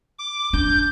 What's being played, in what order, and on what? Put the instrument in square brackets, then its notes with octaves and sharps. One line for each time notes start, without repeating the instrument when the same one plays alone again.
[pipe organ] D6
[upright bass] D4 [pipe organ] G6